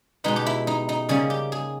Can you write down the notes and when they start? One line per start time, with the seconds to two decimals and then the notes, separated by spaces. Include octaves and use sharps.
0.24 B2 G#3 B3 D#4
0.36 G4
0.46 E4
0.67 D#4
0.89 D#4
1.09 C#3 G3 A#3 C#4 G#4
1.30 G4
1.52 G#4